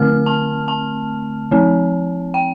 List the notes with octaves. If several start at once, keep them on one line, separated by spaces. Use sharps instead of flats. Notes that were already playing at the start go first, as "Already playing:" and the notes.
Already playing: D3 A3 C4 F6
A5
A5
F3 C4
G5